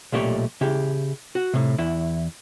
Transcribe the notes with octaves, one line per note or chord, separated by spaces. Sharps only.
B1 A#2 A3 G4 C#5
C#3 E4 G4
F#4
A2 C3
E2 E4